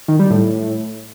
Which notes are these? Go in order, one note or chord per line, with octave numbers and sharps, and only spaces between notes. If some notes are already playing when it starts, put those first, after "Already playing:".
D#3
G3
A2